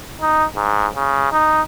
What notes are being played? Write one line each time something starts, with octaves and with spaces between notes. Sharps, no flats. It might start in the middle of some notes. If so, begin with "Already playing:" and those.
D#4
G#2
C#3
D#4